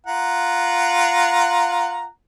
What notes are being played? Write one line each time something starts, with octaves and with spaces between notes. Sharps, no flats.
F4 F#5 A#5